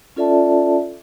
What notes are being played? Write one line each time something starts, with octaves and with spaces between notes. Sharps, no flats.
C#4 F4 A4 D5 E5 A5